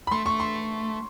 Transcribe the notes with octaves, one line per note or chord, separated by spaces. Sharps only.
B5
A3 C6
A3 C#6
C6